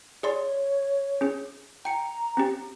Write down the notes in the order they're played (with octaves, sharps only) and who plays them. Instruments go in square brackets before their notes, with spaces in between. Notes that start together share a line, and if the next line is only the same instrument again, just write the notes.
[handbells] G#4 D5 C6 [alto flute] C#5
[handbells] C#4 G#4
[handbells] G5 C#7 [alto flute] A#5
[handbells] C4 C#4 G4